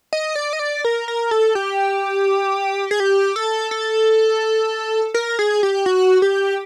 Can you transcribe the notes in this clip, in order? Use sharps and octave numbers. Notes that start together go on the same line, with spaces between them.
D#5
D5
D#5
D5
A#4
A#4
A4
G4
G#4
G4
A4
A4
A#4
G#4
G4
F#4
G4